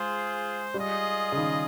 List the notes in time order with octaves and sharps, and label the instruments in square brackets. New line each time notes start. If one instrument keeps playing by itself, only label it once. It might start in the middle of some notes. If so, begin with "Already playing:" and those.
Already playing: [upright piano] G#3 [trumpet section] F4 G#4 C5
[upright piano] G3 [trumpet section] F4 G#4 D#5
[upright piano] C#3
D#3